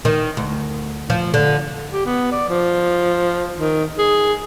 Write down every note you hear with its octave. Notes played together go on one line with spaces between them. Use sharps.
D#3
D2
F3
D3
G4
B3
D5
F3
D#3
G#4